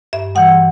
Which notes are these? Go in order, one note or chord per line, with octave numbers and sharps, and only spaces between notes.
G2 E5
E3 G3 F#5